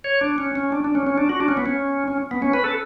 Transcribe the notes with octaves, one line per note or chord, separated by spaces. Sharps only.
C#5
D4
C#4
C#4
D4
D4
C#4
C#4
D4
F#4
D4
C#4
B3
C#4
C#4
B3
C#4
B4
A4